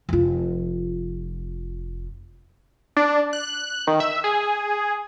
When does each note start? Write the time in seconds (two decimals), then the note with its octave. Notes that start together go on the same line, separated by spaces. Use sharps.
0.09 F1 F4
2.97 D4
3.33 F#6
3.87 D#3
4.00 E5
4.24 G#4